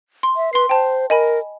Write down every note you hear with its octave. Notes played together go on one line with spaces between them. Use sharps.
C6
E5
B4 C6 C7
C5 G5 A5
A#4 D#5 G#5 B5